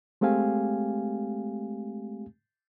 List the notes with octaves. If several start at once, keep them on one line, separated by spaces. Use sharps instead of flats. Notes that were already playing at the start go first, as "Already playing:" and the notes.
G#3 A3 C4 G4 F5 G#5